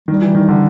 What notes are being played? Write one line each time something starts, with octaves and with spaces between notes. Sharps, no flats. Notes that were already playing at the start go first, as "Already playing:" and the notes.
D#3 G3
E3
D#3
D3